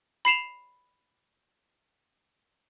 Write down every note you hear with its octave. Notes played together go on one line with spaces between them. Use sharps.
B5 C7 E7 F7